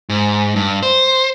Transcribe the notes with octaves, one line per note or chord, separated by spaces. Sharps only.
G#2
G2
C5